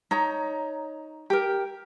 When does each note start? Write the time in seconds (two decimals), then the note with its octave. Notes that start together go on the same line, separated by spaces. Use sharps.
0.11 D#4 C#5 A#5
1.30 G4 A#4